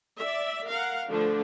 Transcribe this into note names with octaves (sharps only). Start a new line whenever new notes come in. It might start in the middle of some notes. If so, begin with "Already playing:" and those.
D5 E5
A#4 F5 F#5
D3 F3 A3 D4